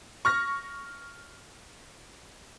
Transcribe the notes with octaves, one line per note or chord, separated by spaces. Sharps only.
C#6 F6 A#6